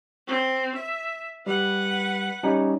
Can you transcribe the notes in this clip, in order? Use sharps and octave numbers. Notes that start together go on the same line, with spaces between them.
C4
E5
G3 B4 F#5
G3 C#4 D#4